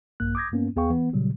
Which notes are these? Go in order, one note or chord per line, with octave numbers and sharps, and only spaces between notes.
A#1 G2 A#3 F#6
D6 D#6 G6 G#6 A#6
G2 A#3 B3 C#4
D#2 B3 G#4 F5 G5 C#6
E3 B3
A#2 C#3 F#3 G3